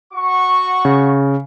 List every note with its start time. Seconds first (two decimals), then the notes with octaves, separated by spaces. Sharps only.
0.13 F#4 C#6
0.85 C#3